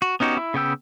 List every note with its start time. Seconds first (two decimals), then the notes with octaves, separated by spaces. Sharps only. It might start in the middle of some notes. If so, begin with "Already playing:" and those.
0.02 F#4
0.20 B3 C#4 D#4 F#4 G4
0.37 E4
0.54 C#3 B3 G5 E6